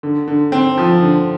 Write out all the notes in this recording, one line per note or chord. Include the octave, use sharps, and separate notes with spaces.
D3
D3
C4
F3
D3